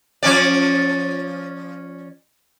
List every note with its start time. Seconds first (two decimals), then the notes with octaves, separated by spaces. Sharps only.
0.23 F3 C#4 D5